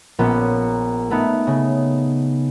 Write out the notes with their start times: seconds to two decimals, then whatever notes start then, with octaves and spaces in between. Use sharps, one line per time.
0.19 A#1 A#2 B3 C#4
1.10 A3 B3 D#4
1.47 C#3